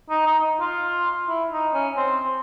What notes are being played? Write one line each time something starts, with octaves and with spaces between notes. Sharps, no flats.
D#4
D#4
F4
E4
D#4
C#4
C4